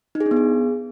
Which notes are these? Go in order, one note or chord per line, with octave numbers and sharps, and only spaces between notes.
D#4
G#4
D4
B3
G#4